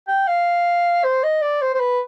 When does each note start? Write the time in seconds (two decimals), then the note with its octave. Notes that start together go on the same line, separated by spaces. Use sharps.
0.08 G5
0.27 F5
1.04 C5
1.24 D#5
1.42 D5
1.62 C5
1.74 C5
1.80 B4